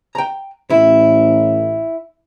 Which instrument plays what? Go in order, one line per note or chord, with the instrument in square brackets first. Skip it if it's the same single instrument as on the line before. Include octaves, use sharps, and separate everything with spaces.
[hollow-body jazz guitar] G5 A#5
[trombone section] A1 [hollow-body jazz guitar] E4